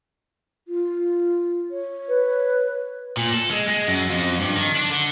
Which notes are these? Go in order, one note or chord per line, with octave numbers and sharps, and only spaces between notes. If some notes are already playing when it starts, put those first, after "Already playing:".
F4
C#5
B4
A#2
A4
G#3
G#3
F#2
F2
G2
D#3
D4
D3